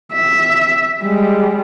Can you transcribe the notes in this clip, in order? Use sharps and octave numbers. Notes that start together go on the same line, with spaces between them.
E5
G3 G#3